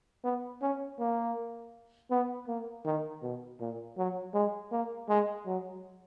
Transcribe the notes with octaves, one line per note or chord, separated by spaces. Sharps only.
B3
C#4
A#3
B3
A#3
D#3
B2
A#2
F#3
G#3
A#3
G#3
F#3